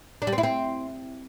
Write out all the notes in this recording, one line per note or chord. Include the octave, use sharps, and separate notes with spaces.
D4
G3
C4
E4
C4